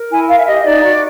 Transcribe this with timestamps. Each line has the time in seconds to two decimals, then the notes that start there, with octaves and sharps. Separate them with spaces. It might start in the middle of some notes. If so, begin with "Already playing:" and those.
Already playing: A#4
0.11 E4 G#5
0.29 A#4 F5
0.38 E5
0.47 G4 D#5
0.65 D#4 D5
0.83 F#4